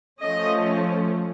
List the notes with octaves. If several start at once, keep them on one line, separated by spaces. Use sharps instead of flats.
F3 A3 C#4 D#5